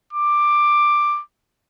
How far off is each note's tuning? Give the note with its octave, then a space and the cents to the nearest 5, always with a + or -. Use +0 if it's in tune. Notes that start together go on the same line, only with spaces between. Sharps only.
D6 +10